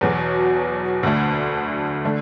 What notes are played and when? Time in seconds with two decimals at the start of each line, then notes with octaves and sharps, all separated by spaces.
0.01 E2 B2 F#3
1.03 D2 D3 A3
2.05 D3 A3